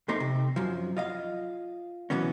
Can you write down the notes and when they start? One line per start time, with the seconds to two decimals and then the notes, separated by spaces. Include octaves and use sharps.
0.08 F2 A#2 A3 C4 D#4 C6
0.20 C3
0.56 F#2 F3
0.97 F4 D#5 F5
2.10 B2 E3 F#3 B3 C#4